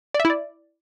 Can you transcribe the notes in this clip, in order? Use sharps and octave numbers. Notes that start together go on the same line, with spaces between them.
D5
E5
E4
D5